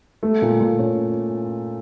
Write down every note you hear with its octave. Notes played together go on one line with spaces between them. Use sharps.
A3
A#2
A#2
C#4